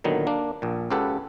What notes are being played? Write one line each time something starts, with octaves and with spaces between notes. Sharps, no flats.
A#2 D3 D#3 F#3 B3
A#3 D4
A#1 A#2
C#2 C#3 G4 A4 B4 F#5